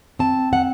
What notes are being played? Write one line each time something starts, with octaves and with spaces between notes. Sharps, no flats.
C4 A5
F#5